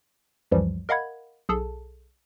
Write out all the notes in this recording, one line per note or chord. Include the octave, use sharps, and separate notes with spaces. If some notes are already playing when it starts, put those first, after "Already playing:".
C#2 F#2 E3 F3 G3
A#4 D#5 F5 F#5 B5 G#6
B1 G#4 A4 A5